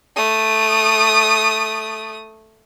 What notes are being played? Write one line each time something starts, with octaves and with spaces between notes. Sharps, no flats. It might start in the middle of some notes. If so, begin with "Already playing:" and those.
A3 D#6